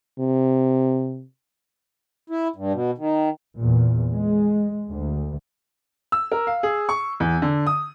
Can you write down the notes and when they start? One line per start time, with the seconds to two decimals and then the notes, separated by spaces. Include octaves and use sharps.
0.19 C3
2.30 E4
2.56 G2
2.73 B2
2.98 D#3
3.59 E2 A#2
4.14 G#3
4.89 D2
6.12 E6
6.32 A#4
6.47 F5
6.63 G#4
6.89 C#6
7.20 E2
7.42 D3
7.67 D#6